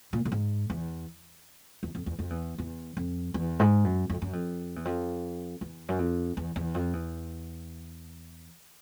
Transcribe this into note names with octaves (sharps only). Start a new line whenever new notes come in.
A#2
A2
G#2
E2
E2
F2
E2
F2
E2
E2
F2
E2
G#2
F#2
F2
F#2
F2
E2
F2
E2
F#2
F2
E2
E2
F2
E2